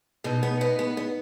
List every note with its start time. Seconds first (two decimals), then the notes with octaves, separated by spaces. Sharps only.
0.24 B2 D#4 D#5
0.43 B3
0.61 B3
0.79 B3
0.97 B3